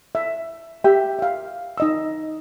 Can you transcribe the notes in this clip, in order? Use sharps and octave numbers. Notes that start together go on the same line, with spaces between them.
E5
G4 E5
E5 F5
D#4 D#5 E6